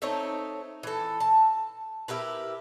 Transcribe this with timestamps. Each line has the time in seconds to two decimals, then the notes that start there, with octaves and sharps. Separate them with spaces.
0.02 A3 C4 D#4 C#5
0.83 E3 A4
1.20 A5
2.08 E4 G4 A#4 B4